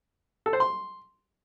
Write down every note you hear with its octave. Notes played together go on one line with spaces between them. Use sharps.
A4
C5
C6